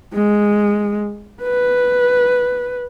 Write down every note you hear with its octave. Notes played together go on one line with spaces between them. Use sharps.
G#3
B4